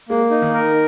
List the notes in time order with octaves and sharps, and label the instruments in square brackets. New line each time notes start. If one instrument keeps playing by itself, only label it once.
[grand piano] G#3 [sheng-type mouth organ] A#3
[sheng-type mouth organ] D#4
[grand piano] D#3
[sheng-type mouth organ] A#4